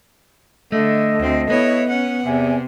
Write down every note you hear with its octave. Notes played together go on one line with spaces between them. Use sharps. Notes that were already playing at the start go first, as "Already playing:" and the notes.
D3 A3 A4 D#5
D2 C4
B3 E4 C#5
C#4 F#5
E2 C3 E5 G#5